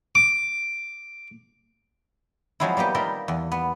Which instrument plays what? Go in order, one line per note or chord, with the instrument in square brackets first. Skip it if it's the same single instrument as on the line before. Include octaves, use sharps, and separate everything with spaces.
[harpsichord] D6
[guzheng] F3 F#3 G#3 C4 E4
G3 A#3 B3 G4
G3 A#3 D#4 F4 A#4 E5
E2
B3